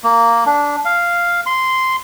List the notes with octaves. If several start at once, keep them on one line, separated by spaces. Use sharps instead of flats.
A#3
D4
F5
C6